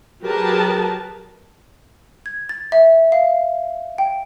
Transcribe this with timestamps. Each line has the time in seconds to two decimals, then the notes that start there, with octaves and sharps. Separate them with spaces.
0.24 F#3 G4 G#4 A#4 B4 A5
2.26 G#6
2.49 A6
2.72 E5
3.12 F5
3.98 G5